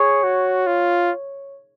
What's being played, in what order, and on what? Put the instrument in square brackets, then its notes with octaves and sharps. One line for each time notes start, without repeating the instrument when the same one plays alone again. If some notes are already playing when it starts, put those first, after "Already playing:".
Already playing: [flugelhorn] G#4 [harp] C#5
[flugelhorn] F#4
F4